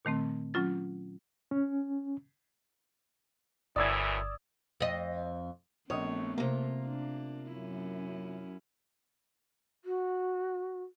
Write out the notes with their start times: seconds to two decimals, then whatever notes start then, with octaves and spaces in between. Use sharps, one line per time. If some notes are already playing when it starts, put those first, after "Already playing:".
0.05 A#2 D#3 A3 C4
0.54 F#3 C#4 F4 A6
1.51 C#4
3.76 G1 F#2 A2 E3 D5 D#6 E6 G#6
4.80 F2 D#5
5.90 A#1 A3 B3 C4 C#5 D#5 D#6
6.38 C3 A#3 F4
6.86 D4
7.53 F#2 C#4 E4
9.84 F#4